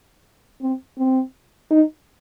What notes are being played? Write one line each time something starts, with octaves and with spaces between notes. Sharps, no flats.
C4
C4
D#4